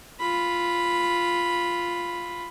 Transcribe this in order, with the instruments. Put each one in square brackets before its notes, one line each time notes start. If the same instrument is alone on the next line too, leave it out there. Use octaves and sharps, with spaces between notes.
[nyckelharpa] F4 B5